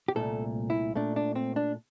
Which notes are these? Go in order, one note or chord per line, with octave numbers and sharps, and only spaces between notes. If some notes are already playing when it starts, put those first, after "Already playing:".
G4
C2 A#2 A3 A4
E4
A#2 A3 D4
D4
C4
D4